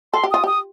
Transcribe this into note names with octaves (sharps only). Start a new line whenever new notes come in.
A4 C6
G4
F4 D#6
G4 D#6